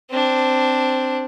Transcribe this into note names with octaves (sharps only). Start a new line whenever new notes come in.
C4 D4